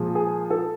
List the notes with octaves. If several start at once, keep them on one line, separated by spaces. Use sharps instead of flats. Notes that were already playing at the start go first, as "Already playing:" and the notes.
Already playing: A#2 F3 G#3
G#4
A4